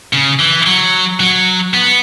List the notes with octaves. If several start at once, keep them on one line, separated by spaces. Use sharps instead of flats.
C#3
E3
F#3
F#3
B3